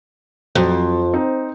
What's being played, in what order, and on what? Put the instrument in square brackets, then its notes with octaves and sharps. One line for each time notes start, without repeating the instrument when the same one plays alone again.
[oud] F2 [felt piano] F#3
[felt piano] C4 D#4